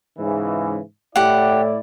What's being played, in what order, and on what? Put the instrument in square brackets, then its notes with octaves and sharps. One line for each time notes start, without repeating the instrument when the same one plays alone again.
[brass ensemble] G#2 C#3 E3
[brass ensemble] A2 E4 D5 [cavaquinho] G4 F#5